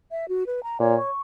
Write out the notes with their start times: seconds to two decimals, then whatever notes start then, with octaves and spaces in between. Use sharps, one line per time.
0.11 E5
0.28 F#4
0.46 B4
0.63 A#5
0.80 A#2 C#5
0.98 C#6